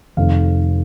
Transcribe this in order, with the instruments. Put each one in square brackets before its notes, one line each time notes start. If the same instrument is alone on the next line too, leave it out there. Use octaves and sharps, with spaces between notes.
[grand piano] F1 F2 D#3 F5